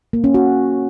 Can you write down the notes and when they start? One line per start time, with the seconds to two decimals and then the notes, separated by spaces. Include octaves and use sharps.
0.13 A#3
0.24 C#4
0.34 F#4